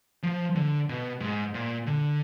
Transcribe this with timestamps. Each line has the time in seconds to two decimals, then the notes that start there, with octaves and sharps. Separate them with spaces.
0.23 F3
0.55 D3
0.89 B2
1.20 G#2
1.54 A#2
1.86 D3